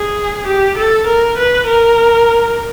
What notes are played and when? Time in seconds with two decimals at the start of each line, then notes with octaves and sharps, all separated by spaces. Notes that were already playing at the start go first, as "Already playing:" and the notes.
Already playing: G#4
0.47 G4
0.78 A4
1.07 A#4
1.38 B4
1.66 A#4